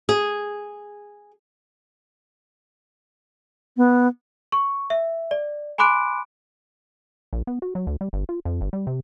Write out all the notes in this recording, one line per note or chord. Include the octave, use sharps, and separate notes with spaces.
G#4
B3
C#6
E5
D5
G#5 B5 C6 D6 F#6 D7
A#1
B3
F#4
F#3
D2
G3
G1
F4
F2
G1
G3
C3